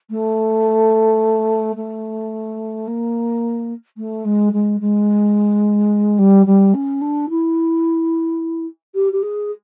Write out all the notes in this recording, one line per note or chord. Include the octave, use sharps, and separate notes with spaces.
A3
A3
A#3
A3
G#3
G#3
G#3
G3
G3
C#4
D4
E4
G4
G4
G#4